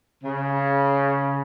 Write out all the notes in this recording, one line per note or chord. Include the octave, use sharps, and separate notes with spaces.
C#3